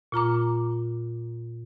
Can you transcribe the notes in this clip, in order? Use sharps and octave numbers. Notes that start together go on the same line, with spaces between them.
A#2 F4 A#5 D6